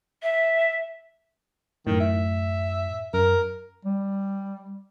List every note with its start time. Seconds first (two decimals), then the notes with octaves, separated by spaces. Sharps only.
0.23 E5
1.87 F#2 A2 D#3
2.00 E5
3.14 F#2 A#4
3.85 G3